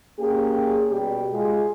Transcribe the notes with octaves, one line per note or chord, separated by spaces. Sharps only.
A#3 C#4 G4 G#4
B2 G3 G4
G#3 F4 G#4